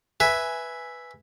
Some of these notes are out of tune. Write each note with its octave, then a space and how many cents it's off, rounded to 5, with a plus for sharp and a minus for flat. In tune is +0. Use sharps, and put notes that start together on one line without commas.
B4 +0 E5 +0 G#5 +0